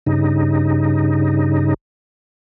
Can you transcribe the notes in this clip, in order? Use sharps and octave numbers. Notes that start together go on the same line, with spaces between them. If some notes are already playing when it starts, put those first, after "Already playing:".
G2 C#3 D#4